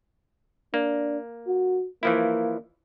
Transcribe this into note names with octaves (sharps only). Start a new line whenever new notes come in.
A#3 D4
F#4
E3 F3 A#3 E4